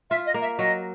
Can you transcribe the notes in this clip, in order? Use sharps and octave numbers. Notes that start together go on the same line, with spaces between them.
F4 E5
D#5
A#3
E5
F#3 D#5